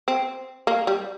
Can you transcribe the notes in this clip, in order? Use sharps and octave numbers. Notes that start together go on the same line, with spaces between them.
C4
A#3
G3